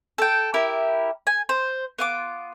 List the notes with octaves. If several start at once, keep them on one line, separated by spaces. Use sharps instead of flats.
A4 G5
E4 G4 A#4
G#5
C5
B3 F4 D6